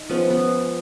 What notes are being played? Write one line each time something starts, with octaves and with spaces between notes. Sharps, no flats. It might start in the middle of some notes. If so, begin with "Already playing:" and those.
Already playing: D#4
F3 G#3 B3 C#4
B3